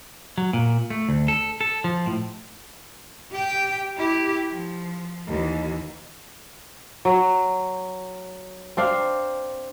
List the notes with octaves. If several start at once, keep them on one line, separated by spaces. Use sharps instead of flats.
F#3
A#2
A3
D2
A4
A4
F3
A2
G4 G5
E4 G4
F3
D#2 E3
F#3
C4 D4 F5